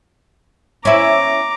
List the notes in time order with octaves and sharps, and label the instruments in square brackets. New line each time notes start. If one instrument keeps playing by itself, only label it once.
[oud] C#4 E4 [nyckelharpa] A#5 D6